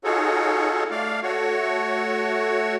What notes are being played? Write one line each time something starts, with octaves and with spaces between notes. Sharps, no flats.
D#4 F4 F#4 G#4 A4 C#5
A3 D5 F5
A3 F#4 C#5